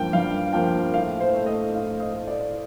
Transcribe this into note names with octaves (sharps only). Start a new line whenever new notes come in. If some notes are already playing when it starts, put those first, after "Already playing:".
Already playing: G2 F3 A#3 G5
G2 F5
F3 A#3 G5
A2 F5
C5
A3
D#5
A2 F5
D#5
A3
D5